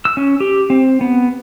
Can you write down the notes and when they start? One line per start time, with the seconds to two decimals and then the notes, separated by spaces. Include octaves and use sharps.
0.05 E6
0.17 C#4
0.40 G4
0.70 C4
1.01 B3